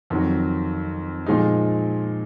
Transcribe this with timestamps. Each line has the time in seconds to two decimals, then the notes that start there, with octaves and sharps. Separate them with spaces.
0.10 F2 D#3 F#3
1.26 A#2 F3 G#3 D#4